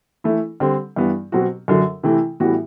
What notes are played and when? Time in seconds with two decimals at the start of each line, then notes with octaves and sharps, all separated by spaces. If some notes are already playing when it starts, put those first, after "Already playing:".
0.24 E3 A3 E4
0.60 D3 G3 C4
0.96 G2 E3 B3
1.32 B2 F#3 C4 F#4
1.68 F#2 D3 F#3
2.03 C3 E3 A3 E4
2.40 A2 E3 G3 B3 F#4